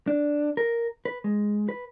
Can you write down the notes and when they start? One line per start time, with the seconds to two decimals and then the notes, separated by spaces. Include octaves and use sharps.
0.07 D4
0.57 A#4
1.05 B4
1.24 G#3
1.69 B4